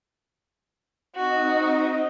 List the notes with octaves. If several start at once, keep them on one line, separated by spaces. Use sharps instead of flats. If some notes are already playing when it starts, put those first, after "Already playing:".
C4 D#4 F#4 D#5